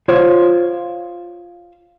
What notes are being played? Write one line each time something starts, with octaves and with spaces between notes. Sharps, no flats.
F4 C5 C#5